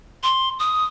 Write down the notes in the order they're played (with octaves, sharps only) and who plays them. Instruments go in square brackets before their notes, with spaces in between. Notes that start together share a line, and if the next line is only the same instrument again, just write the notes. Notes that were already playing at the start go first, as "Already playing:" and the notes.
[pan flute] C6
D#6